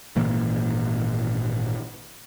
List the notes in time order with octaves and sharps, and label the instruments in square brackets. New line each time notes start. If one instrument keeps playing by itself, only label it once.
[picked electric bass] G#1 A#2 E3 A#3